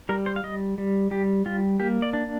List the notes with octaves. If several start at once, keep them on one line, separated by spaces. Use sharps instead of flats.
G3 A#4
C5
F5
G3 D#5
G3
G3 G4
G3 F4
A#3 G4
D5
D4